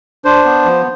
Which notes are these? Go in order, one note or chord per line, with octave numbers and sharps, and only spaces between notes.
D4 C5
B3
F3